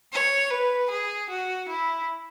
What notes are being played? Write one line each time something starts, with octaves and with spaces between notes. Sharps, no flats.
C#5
B4
G#4
F#4
E4